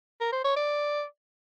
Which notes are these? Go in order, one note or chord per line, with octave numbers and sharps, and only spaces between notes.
A#4
C5
C#5
D5